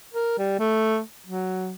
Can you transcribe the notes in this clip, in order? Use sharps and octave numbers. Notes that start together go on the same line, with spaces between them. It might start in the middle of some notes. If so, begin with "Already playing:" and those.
A#4
G3
A3
F#3